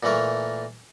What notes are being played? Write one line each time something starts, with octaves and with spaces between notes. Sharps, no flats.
A#2 E3 A3 A#4 C#6